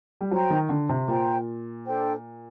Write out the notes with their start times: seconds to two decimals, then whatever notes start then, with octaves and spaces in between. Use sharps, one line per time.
0.21 G3
0.31 F#3 C5 G5 A#5
0.50 D#3
0.69 D3
0.89 C3
1.08 A#2 C5 G5 A#5
1.86 D4 A4 C5 G5